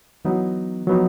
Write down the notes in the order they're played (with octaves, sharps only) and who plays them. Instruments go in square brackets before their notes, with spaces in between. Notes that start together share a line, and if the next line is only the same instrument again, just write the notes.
[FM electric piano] E3 [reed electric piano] F#3 B3 D#4
[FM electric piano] F3 [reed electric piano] F#3 B3 D#4